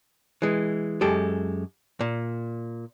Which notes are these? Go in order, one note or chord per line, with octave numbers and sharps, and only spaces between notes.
E3 G#3
F#2 G#3 G4 A4
A#2